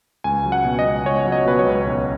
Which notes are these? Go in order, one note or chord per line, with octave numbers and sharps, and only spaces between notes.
C#2 G#5
F#3
F#5
B2
D#5
C#2
C#2 C#5
F#3
D#5
B2 B4
C#5
C#2
B1